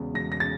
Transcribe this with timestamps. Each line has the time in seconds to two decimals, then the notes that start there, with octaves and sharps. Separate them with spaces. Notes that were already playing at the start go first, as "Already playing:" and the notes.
Already playing: E1 E2 C#3
0.14 E1 A#6
0.32 A#6
0.40 C#3 A6